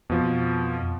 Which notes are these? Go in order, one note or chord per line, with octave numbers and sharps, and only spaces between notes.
F2 B2 F3